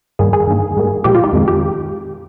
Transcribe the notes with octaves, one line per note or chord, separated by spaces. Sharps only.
G2 D#3 G3 A#3 G#4
G#4
G2 D#3 A#3
G#2 G3 A#3
A#2 F3 G#3 G4
F4
D#4
F2 D#3 G#3
G4